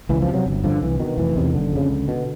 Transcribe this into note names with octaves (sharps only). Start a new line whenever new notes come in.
C#2 E3
F3
C3
F#3
G1
G2 D3 F3
C2 E3
B2 D#3
F1 E3
E2 C3 D#3
F#1 D3
F2 C#3
C#2
B2